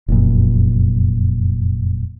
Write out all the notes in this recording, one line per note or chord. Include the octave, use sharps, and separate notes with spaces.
F1 F#2 A#2